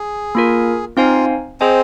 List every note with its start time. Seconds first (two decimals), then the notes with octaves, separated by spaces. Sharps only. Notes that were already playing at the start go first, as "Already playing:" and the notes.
Already playing: G#4
0.35 A#3 F4 A#4
0.97 C4 D#4 F4 C5 F5 G#5
1.60 C4 G#4 C5 D#5 G#5